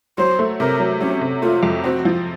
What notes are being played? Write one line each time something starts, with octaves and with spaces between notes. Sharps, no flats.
F#3 C5
A3
C3 A#4
F#3
F#3 C#4
C3
A3 F4
F2
C4 F#4
F3